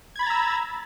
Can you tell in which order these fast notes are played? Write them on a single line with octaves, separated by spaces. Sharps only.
G#6 B5 A6 A#5 E6